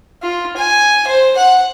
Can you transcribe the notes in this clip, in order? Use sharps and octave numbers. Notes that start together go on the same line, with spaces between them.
F4
G#5
C5
F#5